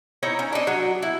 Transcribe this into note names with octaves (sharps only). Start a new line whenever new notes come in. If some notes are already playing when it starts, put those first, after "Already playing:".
D#4 E4 C#5
C#4
D4 D#4
F#3 F#4
E4